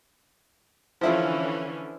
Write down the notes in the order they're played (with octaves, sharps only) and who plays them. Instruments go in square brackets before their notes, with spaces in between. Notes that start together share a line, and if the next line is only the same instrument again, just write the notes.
[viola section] D3 E3 C#4 [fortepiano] F3 E4 F4